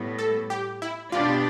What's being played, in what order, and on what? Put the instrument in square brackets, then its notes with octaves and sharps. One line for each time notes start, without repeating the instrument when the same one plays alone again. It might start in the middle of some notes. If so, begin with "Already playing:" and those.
Already playing: [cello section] A2 G3 B3
[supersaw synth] A4
G4
E4
[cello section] B2 B3 D4 G4 D5 [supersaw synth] F4